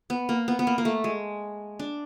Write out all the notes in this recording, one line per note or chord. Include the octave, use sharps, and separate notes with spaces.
B3
A#3
B3
B3
A#3
A#3
A3
G#3
D4